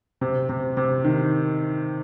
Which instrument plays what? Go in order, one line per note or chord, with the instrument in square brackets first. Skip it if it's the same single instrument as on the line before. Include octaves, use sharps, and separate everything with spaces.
[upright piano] C3
C3
C3
D#3